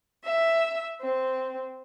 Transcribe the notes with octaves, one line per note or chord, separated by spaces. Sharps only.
E5
C4